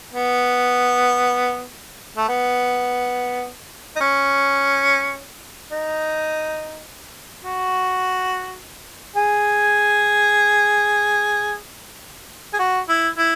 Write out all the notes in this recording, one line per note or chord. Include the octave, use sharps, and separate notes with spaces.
B3
A3
B3
D#4
C#4
D#4
F#4
G#4
G#4
F#4
E4
E4